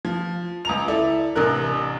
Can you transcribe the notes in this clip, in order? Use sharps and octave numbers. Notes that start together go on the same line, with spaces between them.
F3
C#2 A#5 F7
E4 A4 D5
A1 C3 D4 A#4 F#6